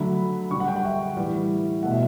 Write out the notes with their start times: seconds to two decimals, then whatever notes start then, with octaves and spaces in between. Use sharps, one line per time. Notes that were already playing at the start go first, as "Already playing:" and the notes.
Already playing: D3 F#3 A3 B5
0.51 D3 G3 C#6
0.60 F#5
0.68 G5
0.76 F#5
0.85 E5
1.17 A2 E3 G3
1.83 B2 A3 F#5
1.91 E5